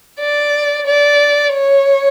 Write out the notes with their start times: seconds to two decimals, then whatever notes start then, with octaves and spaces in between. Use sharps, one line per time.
0.20 D5
0.87 D5
1.54 C#5